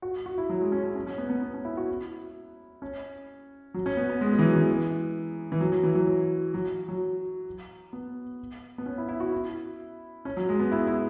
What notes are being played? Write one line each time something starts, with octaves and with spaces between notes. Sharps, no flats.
F#4
F#4
E4
F#3
G#3
C#4
C#4
C#4
C#4
B3
B3
B3
C#4
E4
F#4
E4
C#4
F#3
C#4
B3
B3
G#3
G#3
E3
F#3
E3
E3
F#3
F#3
E3
F#3
F#3
F#3
F#3
B3
B3
C#4
E4
E4
F#4
E4
C#4
F#3
G#3
B3
E4
E4